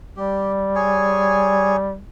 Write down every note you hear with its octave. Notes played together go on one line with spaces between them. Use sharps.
G3 G4
G#4 C#5 G#5